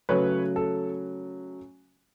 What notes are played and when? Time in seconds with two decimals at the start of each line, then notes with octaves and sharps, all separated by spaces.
0.09 C#3 F#3 A3 B4 C#5
0.56 A4